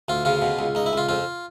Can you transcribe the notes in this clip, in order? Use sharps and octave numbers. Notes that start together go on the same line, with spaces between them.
D2 F4
C#3 F4
B2
C#2
C#2 D#4
E4
C#2 F4
F2 F4